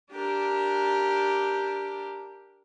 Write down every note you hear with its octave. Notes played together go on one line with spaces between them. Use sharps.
D4 G4 A#4